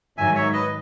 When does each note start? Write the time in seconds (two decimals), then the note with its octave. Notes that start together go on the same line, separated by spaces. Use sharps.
0.17 G#2 D#3 F#3 E5 G#5
0.35 C#5 E5
0.53 B4 D#5